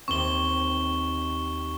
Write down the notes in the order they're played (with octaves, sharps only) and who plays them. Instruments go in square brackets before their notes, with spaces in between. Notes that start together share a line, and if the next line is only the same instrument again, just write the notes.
[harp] D#2 C4 [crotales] C#6 G7